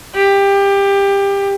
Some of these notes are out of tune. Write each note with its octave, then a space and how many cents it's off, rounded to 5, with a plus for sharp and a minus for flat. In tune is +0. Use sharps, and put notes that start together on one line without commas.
G4 +20